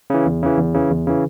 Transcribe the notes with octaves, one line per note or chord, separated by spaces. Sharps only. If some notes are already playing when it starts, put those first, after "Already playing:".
C#3 E3
E2
C#3 E3
E2
C#3 E3
E2
C#3 E3